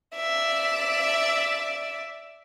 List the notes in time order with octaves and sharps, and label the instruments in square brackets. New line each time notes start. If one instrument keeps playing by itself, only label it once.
[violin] D5 E5